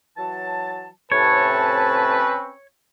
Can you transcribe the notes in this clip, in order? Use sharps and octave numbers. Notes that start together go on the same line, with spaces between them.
E3 F#3 A5
A2 C3 C4 C#4 B4 C#5 A5